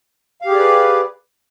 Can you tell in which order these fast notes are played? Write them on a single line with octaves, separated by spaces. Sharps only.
F5 G4 G#4 D5 B4